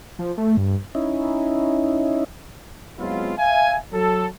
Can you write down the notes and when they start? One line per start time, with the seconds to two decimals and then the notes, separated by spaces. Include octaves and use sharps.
0.19 F3
0.38 A3
0.57 G2
0.95 C#4 D#4 E4
2.98 F#3 G#3 B3 C4 E4 F4
3.38 E5 F5 G#5
3.93 F#3 A4